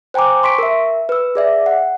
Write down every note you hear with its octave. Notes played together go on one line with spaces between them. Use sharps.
C5 G5 G#5 A#5 D6
C6 C#6 B6 D7
A#4 E5
B4 E6
G#4 D5 E5
F#5